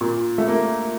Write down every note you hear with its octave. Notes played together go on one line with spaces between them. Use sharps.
A#2
A3
A#3